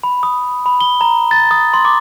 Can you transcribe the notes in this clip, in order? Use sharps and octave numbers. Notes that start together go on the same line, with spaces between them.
B5
D#6
B5
G7
A#5
A6
D#6
C6
D6